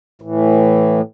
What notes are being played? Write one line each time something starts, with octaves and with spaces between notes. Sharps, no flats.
A2 E3